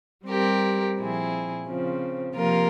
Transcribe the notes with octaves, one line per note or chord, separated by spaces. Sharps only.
G3 C4 G4 A#4
A#2 F3 C4 E4 G#4
C#3 F3 C4
C3 F3 A#3 F4 A#4